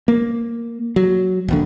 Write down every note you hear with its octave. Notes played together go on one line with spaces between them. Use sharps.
A#3
F#3
D#1 A#1 D3